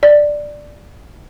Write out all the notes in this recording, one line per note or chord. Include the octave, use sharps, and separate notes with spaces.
D5